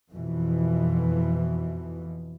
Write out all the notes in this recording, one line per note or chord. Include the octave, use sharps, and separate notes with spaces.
F2 B2 E3